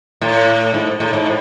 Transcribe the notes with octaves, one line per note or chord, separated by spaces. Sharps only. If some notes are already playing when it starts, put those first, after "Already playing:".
A2
G#2
A2
G#2
A2